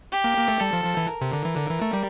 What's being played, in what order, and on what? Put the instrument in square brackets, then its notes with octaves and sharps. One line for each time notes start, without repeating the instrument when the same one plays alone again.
[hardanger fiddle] G4
[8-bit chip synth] A#3
A#3
A3
[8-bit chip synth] G3 [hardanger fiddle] A4
[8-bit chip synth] F3
F3
E3
[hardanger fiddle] A#4
[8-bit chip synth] C3
D3
E3
D3
E3
A3
G3